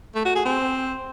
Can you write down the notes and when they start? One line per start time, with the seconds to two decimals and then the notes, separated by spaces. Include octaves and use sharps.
0.15 A3
0.25 F#4
0.35 G#4
0.45 C4